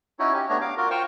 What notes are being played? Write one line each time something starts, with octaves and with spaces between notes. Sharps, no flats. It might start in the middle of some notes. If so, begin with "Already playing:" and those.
C#4 D#4 E4 F#4 C#5
C#4 G4
A3 B3 D4 C#5 A#5
F5 D6
F4 F#4 A#4
F4 C5 G5 C#6 F6